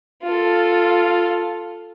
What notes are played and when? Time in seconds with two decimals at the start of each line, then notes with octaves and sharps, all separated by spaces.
0.23 F4 A4